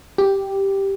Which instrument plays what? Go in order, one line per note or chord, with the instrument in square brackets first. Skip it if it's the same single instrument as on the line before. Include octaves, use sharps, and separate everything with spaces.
[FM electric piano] G4